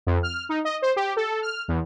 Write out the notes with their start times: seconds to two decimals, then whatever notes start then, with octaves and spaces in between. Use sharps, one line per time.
0.06 F2
0.23 F6
0.49 D#4
0.65 D#5
0.82 C5
0.96 G4
1.16 A4
1.42 F6
1.68 E2